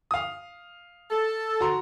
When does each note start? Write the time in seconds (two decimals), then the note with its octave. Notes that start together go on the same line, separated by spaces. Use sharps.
0.11 F5 D#6
1.11 A4
1.61 F#4 A#5 C6